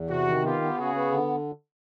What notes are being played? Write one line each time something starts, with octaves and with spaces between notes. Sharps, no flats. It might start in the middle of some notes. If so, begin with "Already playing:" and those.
Already playing: E2
C3 F#4
D#3
B3 F4 G4
B3
C#3 F#4 G#4
B3
D3